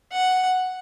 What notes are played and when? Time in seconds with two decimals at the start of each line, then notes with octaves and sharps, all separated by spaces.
0.12 F#5